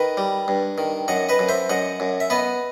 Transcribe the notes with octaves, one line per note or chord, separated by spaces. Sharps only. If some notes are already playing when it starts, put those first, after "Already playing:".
Already playing: D#3 B4 D#5
G3
G2
D#3
F#2 D#5 F#5
B4 D#5
F#2
C5 E5
F#2 D#5 F#5
F#2
E5
B3 B4 D#5